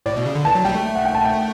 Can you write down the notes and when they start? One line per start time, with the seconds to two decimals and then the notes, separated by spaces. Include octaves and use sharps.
0.06 A2 D5
0.16 B2
0.26 C#3
0.35 D3
0.45 E3 A5
0.55 F#3
0.65 G3 G5
0.75 A3
0.95 F#5
1.05 G5
1.15 A5
1.25 G5